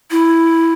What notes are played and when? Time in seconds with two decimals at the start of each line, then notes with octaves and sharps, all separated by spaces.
0.11 E4